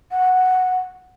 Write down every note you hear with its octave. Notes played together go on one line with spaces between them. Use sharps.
F#5